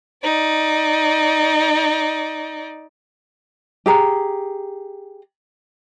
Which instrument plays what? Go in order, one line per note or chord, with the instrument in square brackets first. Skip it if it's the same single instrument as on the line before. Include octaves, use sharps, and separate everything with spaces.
[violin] D#4 D5
[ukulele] G4 G#4 A#5